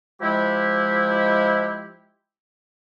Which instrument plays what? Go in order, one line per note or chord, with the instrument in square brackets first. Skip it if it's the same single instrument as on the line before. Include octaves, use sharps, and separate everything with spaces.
[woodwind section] F3 G#3 E4 G4